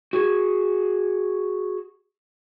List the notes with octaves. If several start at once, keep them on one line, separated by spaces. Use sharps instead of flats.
F#4 G#4